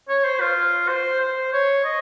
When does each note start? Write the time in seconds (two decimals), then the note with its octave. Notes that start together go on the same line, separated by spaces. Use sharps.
0.09 C#5
0.24 C5
0.40 F4
0.88 C5
1.20 C5
1.53 C#5
1.84 D#5